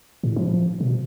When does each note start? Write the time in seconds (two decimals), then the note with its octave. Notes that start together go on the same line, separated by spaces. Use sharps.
0.23 A2
0.36 F3
0.81 B2